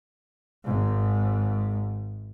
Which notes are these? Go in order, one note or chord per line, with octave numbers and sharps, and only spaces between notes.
G#1 G#2